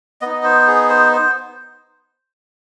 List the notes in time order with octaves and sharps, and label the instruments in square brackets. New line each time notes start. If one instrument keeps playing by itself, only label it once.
[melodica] B3 D#4 D#5
C5
G#4
C5
C5